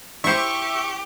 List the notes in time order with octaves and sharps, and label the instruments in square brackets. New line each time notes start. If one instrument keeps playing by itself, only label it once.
[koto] E4 C5 [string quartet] G4 [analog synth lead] E5 [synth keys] C#6